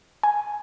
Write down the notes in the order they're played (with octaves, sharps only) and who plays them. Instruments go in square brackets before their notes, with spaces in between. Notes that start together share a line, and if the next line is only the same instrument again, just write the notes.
[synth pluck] G#5